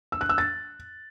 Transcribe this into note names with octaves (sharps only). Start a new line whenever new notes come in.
E6
F#6
E6
A6